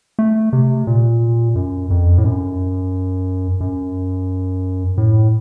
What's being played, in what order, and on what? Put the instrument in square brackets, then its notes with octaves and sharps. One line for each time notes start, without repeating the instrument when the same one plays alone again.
[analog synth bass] A3
C3
A#2
F#2
F2
A2
F#2
F#2
A2